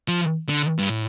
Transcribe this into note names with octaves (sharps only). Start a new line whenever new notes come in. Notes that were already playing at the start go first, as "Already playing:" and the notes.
F3
D3
G2
A2